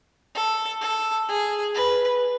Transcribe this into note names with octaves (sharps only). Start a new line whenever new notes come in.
A4
A4
G#4
B4